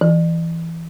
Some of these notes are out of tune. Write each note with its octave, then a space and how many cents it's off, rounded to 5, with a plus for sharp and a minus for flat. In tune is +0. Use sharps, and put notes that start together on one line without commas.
E3 +10